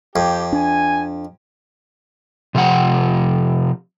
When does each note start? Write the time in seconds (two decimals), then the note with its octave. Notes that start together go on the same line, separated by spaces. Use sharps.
0.16 F2 G4
0.53 D4 G#5
2.55 C3 F3 G4 F#5